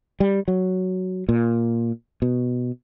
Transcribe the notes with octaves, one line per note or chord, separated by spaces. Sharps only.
G3
F#3
A#2
B2